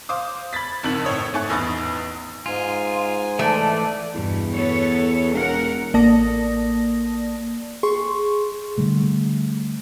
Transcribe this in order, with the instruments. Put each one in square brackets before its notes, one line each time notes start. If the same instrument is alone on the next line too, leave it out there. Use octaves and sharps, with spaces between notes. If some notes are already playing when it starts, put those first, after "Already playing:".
[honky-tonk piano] C5 F5 D6 D#6
B5 G#6 A6 B6
F#1 F2 D#3 F#7
A2 C4 C#5 D#6
G#2 A3 A4 G#5 C#6 F#6
A1 E2 D#4 B5 D#6 A6
[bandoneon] G#2 G#5 [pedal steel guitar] F4
[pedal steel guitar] E3 D5 [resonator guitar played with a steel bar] A3
[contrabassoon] E2 [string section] G2 B2
[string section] B3 A4 C#5
[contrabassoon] E1 [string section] A#4 F#5
[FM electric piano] A1 A#3 D5 A5 D#6 A#6
G#4 C6 C#6
[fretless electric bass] D3 G3 A3